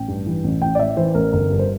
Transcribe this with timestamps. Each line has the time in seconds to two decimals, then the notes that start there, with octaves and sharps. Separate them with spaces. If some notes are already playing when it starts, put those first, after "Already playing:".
Already playing: A1 G5
0.08 G2
0.26 E3
0.44 A1
0.62 A1 G5
0.75 D5
0.79 A2 E5
0.97 E3 C5
1.15 A1 A#4
1.33 G1 A#4
1.51 G2
1.59 C5